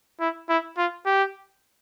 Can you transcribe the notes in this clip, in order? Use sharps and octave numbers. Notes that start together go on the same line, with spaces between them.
E4
E4
F4
G4